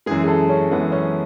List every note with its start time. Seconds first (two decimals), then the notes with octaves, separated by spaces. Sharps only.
0.06 F#2 E3 G#3 G#4
0.24 G#4
0.28 A4
0.49 C#4
0.71 F#2 E3 G#3 B3
0.92 C#4